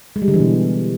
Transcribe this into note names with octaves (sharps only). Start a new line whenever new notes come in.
G#3
G3
D3
E3
B2